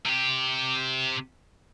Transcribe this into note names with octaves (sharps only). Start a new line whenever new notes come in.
C3 G4